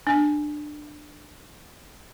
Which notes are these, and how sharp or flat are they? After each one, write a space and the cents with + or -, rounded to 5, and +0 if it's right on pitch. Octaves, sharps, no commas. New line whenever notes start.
D4 +20